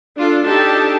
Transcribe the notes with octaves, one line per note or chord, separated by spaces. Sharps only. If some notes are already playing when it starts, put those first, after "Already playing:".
D4 F4 A4
D4 D#4 G4 A4 A5